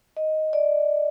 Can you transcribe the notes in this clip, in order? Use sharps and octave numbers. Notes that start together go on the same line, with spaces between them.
D#5
D5